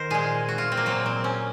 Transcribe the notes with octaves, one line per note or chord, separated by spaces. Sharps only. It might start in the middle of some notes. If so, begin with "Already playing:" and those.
Already playing: D#3 A#4 C5
A#2 G#3 G#4
F#4
F4
C4
A#3
A#2 F#3 C4
C4
C#4